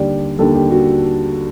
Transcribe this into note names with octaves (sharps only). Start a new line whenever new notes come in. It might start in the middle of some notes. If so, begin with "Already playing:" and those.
Already playing: D#2 D3 G3 D5
D#2 D3 G3 A4
G4
F#4